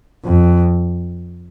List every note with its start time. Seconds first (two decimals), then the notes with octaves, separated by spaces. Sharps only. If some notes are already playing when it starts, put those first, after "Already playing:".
0.25 F2